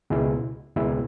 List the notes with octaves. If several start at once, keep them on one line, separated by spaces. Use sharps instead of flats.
C#2 B2 G#3 E4
C#2 B2 G#3 E4